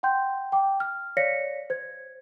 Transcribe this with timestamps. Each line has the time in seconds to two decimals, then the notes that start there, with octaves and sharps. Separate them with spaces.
0.03 F#5 G5 C6 G6
0.52 G5 D6
0.80 F6
1.17 C#5 D5 F5 A#6 B6 C#7
1.70 C5 G#6